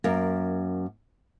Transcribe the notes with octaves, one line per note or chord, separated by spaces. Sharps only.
F#2 A#3